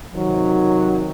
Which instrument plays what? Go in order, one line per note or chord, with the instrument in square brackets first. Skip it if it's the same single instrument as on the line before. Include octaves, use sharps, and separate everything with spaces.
[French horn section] C3 D#3 [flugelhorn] F#3